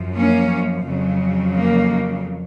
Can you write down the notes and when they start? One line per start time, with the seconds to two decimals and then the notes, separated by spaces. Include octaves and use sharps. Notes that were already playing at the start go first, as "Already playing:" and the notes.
Already playing: F#2 F3
0.16 A#3 C#4
0.85 F2 C#3 F#3
1.54 A#3